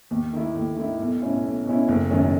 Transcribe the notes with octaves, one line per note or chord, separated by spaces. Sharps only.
D#2
D#3 A3 E4
D#2
D#3 A3 E4
B1
B2 A3 C#4 E4
B1
B2 A3 C#4 E4
F#1
F#2 D#3 A3 C#4